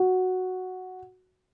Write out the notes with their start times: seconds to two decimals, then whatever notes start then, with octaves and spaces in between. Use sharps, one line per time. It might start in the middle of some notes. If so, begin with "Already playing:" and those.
Already playing: F#4